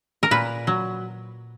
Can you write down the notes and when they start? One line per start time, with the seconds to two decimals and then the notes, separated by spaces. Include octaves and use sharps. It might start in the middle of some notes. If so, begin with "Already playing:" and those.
0.23 A#4
0.31 A#2 B4
0.67 F#3